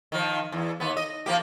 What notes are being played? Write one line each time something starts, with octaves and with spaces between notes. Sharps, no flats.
D#3 F3
E2
D#2 B3
D#5
F3 A#3 G4